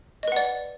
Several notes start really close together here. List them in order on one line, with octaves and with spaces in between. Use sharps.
D#5 B4 F#5 D5